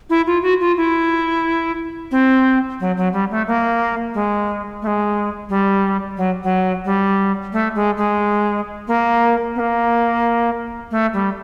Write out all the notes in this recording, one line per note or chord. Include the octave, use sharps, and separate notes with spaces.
E4
F4
F#4
F4
E4
C4
F#3
F#3
G3
A3
A#3
G#3
A3
G#3
G3
F#3
F#3
G3
A3
G#3
G#3
A#3
B3
A#3
A3
G3